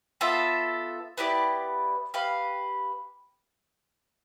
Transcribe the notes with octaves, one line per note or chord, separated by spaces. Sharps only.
B3 F4 A4 E5
B3 E4 G4 D5
G4 B4 F5